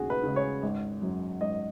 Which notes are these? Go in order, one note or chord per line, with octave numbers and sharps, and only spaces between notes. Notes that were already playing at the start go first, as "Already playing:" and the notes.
Already playing: D#2 C#3 G#3 F#4 G#4
B4
C#3 G#3
C#5
G#1
F#2 F#3 C#4
G#1 D#5